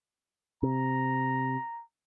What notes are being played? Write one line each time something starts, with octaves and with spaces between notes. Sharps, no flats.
C3 A#5